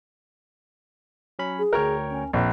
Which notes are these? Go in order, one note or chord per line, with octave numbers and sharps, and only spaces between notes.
F#3 C#4 B5
G#4
D2 A#4 C#5 G5
C#4
A#1 A#3 C4